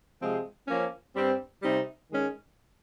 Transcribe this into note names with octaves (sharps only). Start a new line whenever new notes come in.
C3 F3 G#3 C4
F3 A#3 C#4
G2 G3 C4
C3 G3 C4 D#4
D#3 G#3 C#4